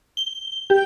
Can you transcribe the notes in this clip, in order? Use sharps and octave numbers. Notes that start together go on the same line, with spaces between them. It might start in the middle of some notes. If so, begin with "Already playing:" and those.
G7
G4